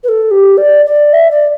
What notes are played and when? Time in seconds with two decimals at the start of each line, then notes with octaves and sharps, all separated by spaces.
0.04 B4
0.09 A4
0.31 G4
0.57 D5
0.86 D5
1.13 E5
1.31 D5